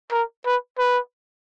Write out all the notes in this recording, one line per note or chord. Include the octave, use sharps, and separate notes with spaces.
A#4
B4
B4